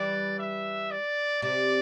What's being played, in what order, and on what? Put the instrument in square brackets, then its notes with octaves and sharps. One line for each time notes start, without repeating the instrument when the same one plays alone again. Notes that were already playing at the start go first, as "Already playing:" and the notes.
Already playing: [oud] E3 G3 [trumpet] D5
[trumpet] E5
D5
[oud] C3 [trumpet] D5